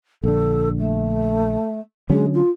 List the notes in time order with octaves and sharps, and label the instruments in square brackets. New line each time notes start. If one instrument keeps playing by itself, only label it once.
[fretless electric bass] A#1 D3 [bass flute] A4
[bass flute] A3
[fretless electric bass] D3 F#3 C#4 [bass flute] G#3
[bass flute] F4